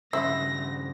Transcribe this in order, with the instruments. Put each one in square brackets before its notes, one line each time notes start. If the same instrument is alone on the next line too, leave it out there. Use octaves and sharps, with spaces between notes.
[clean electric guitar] G2 C#3 [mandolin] C5 F#5 B5 [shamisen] E5 [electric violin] A#6